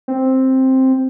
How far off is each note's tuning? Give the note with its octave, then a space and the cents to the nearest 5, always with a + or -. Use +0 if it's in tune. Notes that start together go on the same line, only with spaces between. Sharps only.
C4 +5